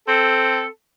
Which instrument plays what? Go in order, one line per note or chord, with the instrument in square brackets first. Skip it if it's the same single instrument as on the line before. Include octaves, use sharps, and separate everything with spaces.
[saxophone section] C4 A4